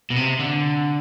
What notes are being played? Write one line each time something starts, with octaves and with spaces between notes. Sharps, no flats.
B2
C3
D3